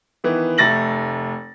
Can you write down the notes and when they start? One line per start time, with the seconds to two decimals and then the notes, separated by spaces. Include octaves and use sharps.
0.24 D#3 E3 B3
0.58 F1 A3 A6 A#6 F#7